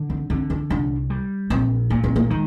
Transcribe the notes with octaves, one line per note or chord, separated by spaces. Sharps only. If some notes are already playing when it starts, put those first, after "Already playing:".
Already playing: D3
C4
D3 C4
D4
C2 D4
G3
A#1 C4
A#2 A#3
C4
A#3
D#3 G#3